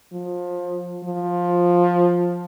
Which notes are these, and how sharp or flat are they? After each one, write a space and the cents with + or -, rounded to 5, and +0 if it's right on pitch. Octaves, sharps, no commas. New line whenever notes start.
F3 +25
F3 +10